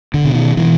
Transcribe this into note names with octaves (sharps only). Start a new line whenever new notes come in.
D3
B2
D#3
B2 E3